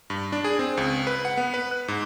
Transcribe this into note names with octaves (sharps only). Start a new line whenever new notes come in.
G2
D4
G#4
C4
C#2
B4
F#5
B3
B4
F#6
G#2